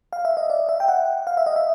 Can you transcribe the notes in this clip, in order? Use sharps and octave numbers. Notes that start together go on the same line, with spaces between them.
F5
E5
D#5
D5
E5
G5
F#5
F5
E5
D#5
E5